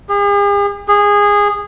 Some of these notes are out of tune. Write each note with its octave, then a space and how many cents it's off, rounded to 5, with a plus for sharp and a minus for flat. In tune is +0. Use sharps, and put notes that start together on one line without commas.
G#4 -45
G#4 -20